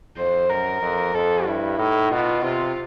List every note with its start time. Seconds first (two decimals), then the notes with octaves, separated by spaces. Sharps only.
0.17 F2 C5
0.49 F#2 A#4
0.82 F2
1.14 F2 A4
1.45 G2 E4
1.78 A2 D#4
2.11 B2 F4
2.43 C3 F4